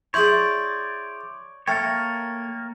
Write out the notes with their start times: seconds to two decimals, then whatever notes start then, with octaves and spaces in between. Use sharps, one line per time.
0.14 E4 G#4 C#5 D5 C6 G6 F#7
1.68 A3 A#3 A#4 C#5 G5 A6 C#7